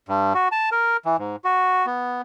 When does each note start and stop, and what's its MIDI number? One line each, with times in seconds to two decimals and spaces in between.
0.09 0.33 43
0.35 0.48 66
0.52 0.69 81
0.72 0.97 70
1.05 1.17 52
1.18 1.36 44
1.44 1.86 66
1.86 2.22 59